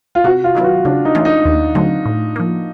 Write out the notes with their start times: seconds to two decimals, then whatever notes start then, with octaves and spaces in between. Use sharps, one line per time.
0.15 F4
0.24 C3 F#4
0.44 F4
0.55 D#3 F#3 B3 E4
0.64 F#4
0.85 C#3 D4
1.05 D#4
1.15 E3 A3 C#4 F4
1.25 D#4
1.45 D#2
1.75 D3 F#3 A3 C4
2.06 A2
2.36 F3 A#3